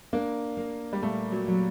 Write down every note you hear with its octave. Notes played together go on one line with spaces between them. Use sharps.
A#3 D4
A#3
G3
A#2 A3
F#3
F#3